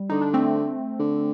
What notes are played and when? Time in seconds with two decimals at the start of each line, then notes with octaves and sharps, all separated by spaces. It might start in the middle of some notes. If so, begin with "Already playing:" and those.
Already playing: G3
0.09 D3 D#4
0.21 D4
0.34 A3 C4
0.99 D3